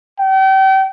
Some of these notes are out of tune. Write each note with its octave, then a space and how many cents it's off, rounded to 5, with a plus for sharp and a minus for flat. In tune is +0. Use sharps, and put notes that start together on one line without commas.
G5 -35